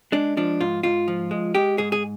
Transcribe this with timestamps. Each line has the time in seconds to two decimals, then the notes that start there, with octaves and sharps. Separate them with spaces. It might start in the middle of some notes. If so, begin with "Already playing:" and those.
0.12 G#3 D4
0.37 F3 D4
0.60 G#2 F4
0.83 G#2 F4
1.08 F3
1.31 G#3
1.55 G#3 G4
1.78 G#2 G#4
1.92 G#4